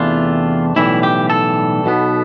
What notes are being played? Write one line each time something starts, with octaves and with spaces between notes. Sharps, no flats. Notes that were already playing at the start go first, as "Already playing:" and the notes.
Already playing: E2 C3 E3 A3 D4 F4
B1 A2 E3 G3 E4
G4
A4
B1 B2 B3